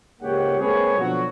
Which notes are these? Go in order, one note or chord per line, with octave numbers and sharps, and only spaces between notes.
C#2 G#2 A#3 G4 C#5 F#5
G#3 A#3 C4 G#4 B4 C#5
B2 D3 F3 F#3 F#4